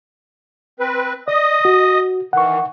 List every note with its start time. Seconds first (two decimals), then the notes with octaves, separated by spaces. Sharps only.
0.80 C4 B4
1.28 D5 D#5 D#6
1.65 F#4
2.33 D#3 E3 F#5 C#6